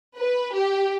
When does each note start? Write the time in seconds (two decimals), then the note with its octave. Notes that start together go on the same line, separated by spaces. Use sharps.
0.18 B4
0.55 G4